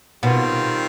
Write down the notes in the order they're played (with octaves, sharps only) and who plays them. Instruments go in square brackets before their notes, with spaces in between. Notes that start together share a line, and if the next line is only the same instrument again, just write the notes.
[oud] B2 [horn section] D#3 G3 C4 F4